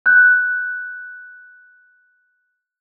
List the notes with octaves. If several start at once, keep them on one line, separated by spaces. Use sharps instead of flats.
F#6 G6